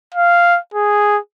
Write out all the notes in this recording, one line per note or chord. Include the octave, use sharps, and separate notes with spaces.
F5
G#4